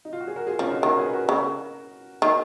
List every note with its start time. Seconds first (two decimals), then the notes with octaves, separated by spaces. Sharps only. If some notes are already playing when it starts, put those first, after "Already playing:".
0.05 D#4
0.13 F4
0.20 F#4
0.27 G#4
0.36 F#4 A#4
0.47 F4 G#4
0.59 F3 C#4 F4
0.71 D#4 F#4
0.82 D#3 F#4 A#4
0.98 G#4 B4
1.13 F#4 A#4
1.29 C#3
2.22 D#3 F#4 A#4